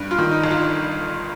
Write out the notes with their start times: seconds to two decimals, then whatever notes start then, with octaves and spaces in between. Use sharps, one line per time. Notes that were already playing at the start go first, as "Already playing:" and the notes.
Already playing: G2
0.11 F4
0.18 D#3
0.31 D#4
0.44 G1
0.51 F4